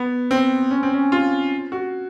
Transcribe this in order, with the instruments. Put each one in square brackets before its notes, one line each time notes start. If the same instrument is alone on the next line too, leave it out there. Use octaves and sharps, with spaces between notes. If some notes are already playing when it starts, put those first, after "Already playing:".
Already playing: [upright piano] B3
C4
C#4
C4
C#4
F4
F#4